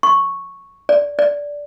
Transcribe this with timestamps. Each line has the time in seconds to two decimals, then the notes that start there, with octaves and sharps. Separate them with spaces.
0.03 C#6
0.89 D5
1.19 D5